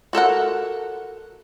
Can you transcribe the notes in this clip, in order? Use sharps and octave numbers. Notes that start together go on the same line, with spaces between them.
F#4 A4 A#4 F#5